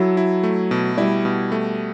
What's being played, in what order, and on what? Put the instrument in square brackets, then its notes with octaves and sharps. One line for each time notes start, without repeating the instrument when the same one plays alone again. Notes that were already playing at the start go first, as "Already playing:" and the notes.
Already playing: [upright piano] F#3 [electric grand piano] E4 A4
[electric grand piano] E4
A3
B2
[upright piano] G3 [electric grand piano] E4
[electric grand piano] B2
A3